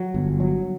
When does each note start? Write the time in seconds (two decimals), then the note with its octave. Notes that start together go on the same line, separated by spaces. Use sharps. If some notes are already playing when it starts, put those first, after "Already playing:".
Already playing: F#3
0.14 G1
0.40 F#3